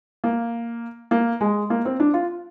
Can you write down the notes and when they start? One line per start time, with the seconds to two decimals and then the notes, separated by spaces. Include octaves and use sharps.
0.24 A#3
1.11 A#3
1.41 G#3
1.70 A#3
1.85 C4
2.00 D4
2.14 F4